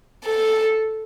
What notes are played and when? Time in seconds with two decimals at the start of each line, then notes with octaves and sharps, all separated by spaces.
0.25 A4